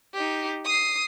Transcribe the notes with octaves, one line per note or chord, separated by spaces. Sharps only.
D#4 G4
D#6 C7